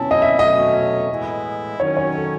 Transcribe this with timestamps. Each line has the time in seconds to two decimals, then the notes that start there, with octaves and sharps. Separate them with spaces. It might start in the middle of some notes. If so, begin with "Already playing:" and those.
Already playing: B2 F#3 C#4 E4 A5
0.11 D#5
0.22 E5
0.39 B2 F#3 A3 C#4 D#5
1.09 A2 E3 G#3 B3 E4
1.79 D#3 F#3 C#4 C#5
1.97 C#5
2.15 A4